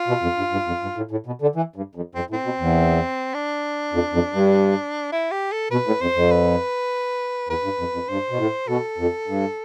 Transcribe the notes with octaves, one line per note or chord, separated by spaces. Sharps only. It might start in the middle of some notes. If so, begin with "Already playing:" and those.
Already playing: F4
B2
F2
G2
G2
F2
G2
A2
A2
B2
D3
E3
G2
F2
F2 C4
A2
C4
B2
E2
D4
F2
F2
G2
E4
G4
A4
B2 B4
A2
F2 C5
F2
B4
E2 B4
G2
F2
F2
G2 C5
B2
A2
B2 A4
F2
G2